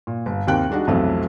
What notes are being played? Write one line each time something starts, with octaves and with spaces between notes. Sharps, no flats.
A#2
G1
D#2 C3 D#3 A#3 G5 F#6
G3 G#3 D4 D#4 F#4
B1 F2 C3 E3 F#3 A3